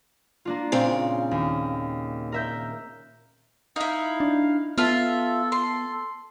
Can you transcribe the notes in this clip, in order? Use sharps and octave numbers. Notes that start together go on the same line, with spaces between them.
A#3 D4 F4
A#2 C#3 C4
D#2
A#4 E5 G6
D#4 E4 F5
D4
B3 F4 A4 E5
C6